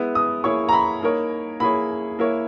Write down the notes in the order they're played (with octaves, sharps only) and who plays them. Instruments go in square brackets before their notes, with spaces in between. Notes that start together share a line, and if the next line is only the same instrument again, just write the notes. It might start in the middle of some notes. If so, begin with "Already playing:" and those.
Already playing: [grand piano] G#3 B3 E4 B4
[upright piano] D#6
[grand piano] A#3 E4 G#4 C#5 [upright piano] C#6
[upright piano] A#5
B5
[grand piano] A#3 D#4 A#4 C#5
[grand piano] A#3 E4 G#4 C#5 [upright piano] B5
[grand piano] A#3 E4 A#4 C#5